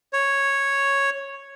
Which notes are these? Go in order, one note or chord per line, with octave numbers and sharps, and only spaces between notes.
C#5